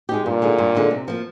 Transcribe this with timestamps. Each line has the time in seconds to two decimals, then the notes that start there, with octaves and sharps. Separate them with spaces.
0.09 G#3 D#4 G4
0.25 G2 A#2
0.42 D3 G#3 D#4
0.58 G2
0.75 D3 G#3 D#4
0.91 C3
1.08 F3 A#3